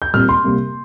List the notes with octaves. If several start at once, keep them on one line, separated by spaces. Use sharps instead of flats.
G6
A#2 G3 C4 F6
C6
C3 G3 A#3